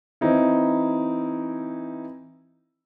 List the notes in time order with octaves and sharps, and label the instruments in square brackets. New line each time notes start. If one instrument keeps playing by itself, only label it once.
[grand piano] E3 C4 D#4 E4